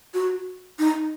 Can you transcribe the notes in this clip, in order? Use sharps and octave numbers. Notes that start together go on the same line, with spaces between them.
F#4
D#4